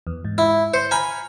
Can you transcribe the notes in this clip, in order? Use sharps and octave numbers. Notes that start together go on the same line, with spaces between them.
E2
G#2
E4
C5 G6 C#7
G#5 A#5 B5 F6